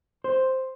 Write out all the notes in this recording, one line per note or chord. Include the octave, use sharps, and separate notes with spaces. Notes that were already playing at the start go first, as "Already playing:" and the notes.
C5